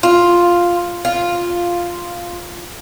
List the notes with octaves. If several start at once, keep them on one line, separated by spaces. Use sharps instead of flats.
F4
F4